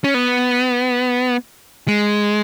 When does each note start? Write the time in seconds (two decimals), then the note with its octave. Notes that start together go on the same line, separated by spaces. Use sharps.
0.04 C#4
0.14 B3
1.88 G#3